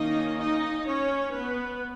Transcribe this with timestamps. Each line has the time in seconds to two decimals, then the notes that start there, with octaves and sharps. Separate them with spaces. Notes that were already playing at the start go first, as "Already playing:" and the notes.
Already playing: D#3 A#3 C#4 D#4 D#5
0.38 D#4 D#5
0.86 C#4 C#5
1.34 B3 B4